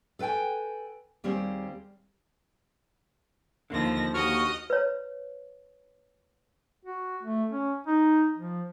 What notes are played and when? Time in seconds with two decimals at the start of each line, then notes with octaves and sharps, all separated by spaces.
0.19 A4 B4 F5 G5 G#5
1.24 D#2 G3 A#3 C4 G#4 C5
3.70 D#2 D3 F3 A#3 A#6
4.14 D#2 F#4 D#5 C#6 D#6 F6
4.70 B4 C#5
6.85 F#4
7.23 A3
7.50 C#4
7.87 D#4
8.38 F3